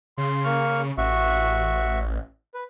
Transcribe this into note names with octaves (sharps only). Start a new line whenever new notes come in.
C#3 C6
A#3 C#6 F6
A1 F#4 E5 C#6
B4